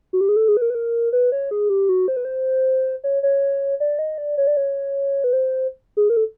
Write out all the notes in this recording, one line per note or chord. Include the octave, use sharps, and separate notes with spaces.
F#4
G4
G#4
A4
G#4
B4
A#4
B4
A#4
B4
C#5
G#4
G4
F#4
C5
B4
C5
C#5
C#5
D5
D#5
D5
C#5
D5
C#5
B4
C5
G#4
A#4
A4